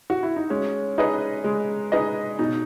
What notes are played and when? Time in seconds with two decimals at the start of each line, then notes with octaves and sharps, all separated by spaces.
0.10 F#4
0.23 E4
0.36 D#4
0.50 G#3 C#4
0.98 D#4 G#4 B4 D#5
1.44 G#3
1.92 D#4 G#4 B4 D#5
2.39 B2 D#4